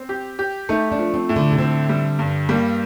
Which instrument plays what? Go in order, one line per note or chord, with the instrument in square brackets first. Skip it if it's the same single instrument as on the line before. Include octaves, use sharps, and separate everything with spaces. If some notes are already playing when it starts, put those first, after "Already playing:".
Already playing: [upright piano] C4
G4
G4
[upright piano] A3 [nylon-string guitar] D#4
[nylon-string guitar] D4
[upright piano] F3
[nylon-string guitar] C4
[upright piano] A2
[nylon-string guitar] D3
C3
[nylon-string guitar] D3 [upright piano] C4
[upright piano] G3
G2
[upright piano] G3 [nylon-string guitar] A#3